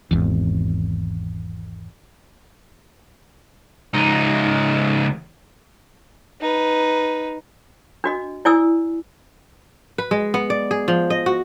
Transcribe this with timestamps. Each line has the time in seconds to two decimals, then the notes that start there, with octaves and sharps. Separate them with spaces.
0.11 G#1 E2
3.94 C#2 D#4
6.41 D#4 B4
8.04 D4 F#4 D#5
8.45 E4 D5 G#5 D#6 E6
9.98 B4
10.11 G#3
10.34 B3
10.50 D5
10.71 G#4
10.88 F3
11.10 D#5
11.26 F#4